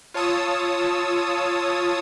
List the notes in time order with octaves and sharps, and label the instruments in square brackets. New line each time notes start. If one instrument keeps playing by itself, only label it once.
[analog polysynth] F4 C#5 A5 D#6 E6